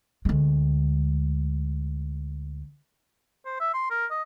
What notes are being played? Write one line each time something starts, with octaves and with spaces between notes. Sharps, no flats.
D2 G#3
C5
E5
C6
A#4
D#5